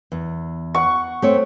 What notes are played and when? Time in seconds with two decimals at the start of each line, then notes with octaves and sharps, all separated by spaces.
0.12 E2
0.75 F#5 C#6
1.22 A3 C4 C#5